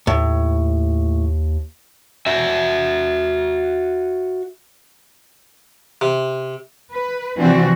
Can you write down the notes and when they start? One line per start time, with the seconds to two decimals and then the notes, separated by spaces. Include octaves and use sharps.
0.07 D#2 A2
2.26 F#4 E5
6.01 C3
6.90 B4
7.38 C3 E3 F3 C4 D4 F#4